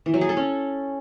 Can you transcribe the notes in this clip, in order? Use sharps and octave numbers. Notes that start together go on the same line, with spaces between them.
E3
F#3
G#4
A4
C#4